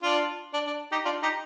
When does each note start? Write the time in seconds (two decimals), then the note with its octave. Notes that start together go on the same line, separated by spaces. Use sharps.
0.02 D4 F4
0.54 D4
0.67 D4
0.92 D#4 G4
1.05 D4 F4
1.23 D#4 G4